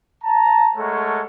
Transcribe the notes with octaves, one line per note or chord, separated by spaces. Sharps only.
A5 A#5
G#3 A3 A4 A#4 C#5 F#5